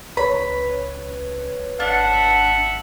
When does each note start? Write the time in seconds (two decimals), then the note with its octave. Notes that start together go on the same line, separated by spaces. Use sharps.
0.17 C#2 B4 C#5 B5
1.80 G#1 D4 E5 F#5